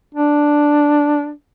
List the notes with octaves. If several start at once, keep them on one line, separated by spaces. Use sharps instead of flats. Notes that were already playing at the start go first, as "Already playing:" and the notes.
D4